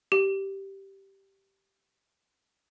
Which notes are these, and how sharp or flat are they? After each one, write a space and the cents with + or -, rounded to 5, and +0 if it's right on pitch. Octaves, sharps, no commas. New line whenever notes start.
G4 -10